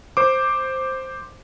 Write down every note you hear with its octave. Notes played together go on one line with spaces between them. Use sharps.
C5 D6